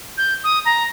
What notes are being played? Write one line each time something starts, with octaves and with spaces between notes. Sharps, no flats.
G6
D#6
A#5